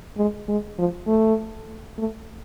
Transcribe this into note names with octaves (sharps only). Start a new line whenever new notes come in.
G#3
G#3
F3
A3
A3